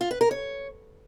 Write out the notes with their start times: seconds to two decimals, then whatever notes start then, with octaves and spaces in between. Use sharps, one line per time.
0.01 F4
0.11 B4
0.21 A#4
0.31 C#5